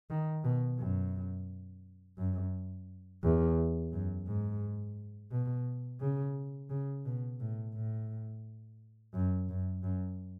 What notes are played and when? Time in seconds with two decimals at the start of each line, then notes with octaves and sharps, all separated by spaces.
0.10 D#3
0.44 B2
0.79 F#2
2.18 F#2
3.23 E2
3.92 F#2
4.27 G#2
5.32 B2
6.00 C#3
6.70 C#3
7.06 B2
7.40 A2
7.74 A2
9.14 F#2
9.49 F#2
9.83 F#2